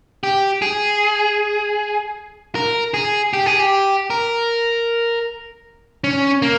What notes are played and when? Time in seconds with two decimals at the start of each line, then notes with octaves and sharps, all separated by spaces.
0.23 G4
0.62 G#4
2.55 A#4
2.94 G#4
3.33 G4
3.46 G#4
3.59 G4
4.10 A#4
6.04 C#4
6.42 A#3